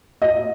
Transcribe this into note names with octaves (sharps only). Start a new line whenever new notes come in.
D#5